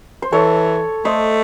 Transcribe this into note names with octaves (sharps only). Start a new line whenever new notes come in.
C5
E3 A4 C#5
A3 C5 D#5